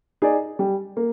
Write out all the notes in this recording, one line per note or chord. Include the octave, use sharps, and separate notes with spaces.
D#4 G#4 D5
G3
A#3